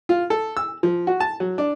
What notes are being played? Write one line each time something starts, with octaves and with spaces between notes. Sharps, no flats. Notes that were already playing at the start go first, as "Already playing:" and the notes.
F4
A4
E6
F3
F#4
A5
F#3
D4